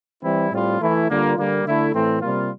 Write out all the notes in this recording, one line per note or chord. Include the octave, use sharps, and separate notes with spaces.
E3 G3 C4 E4
A2 G3 C4 F4
E3 A3 E4
D3 G3 A#3 F4
D3 G3 A#3
D3 A3 E4
A2 E3 A3 C4
C3 G3 A#3 F4